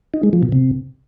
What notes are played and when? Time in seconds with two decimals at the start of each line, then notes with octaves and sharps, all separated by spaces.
0.14 D#4
0.23 G#3
0.33 F3
0.43 B2
0.52 C3